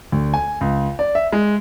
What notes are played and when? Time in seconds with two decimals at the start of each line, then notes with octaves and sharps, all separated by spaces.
0.12 D2
0.34 G#5
0.61 C#2
0.99 D5
1.15 E5
1.32 G#3